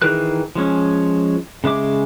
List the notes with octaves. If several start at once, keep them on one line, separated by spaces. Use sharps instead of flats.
D#3 E3 G#4 A#4 F#6
F3 G#3 C#4
C#3 G#3 E5 D6